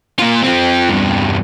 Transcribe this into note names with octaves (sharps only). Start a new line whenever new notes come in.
A#2 F4
F3 C4
E2 G2